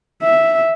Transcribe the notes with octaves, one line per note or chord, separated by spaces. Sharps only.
E5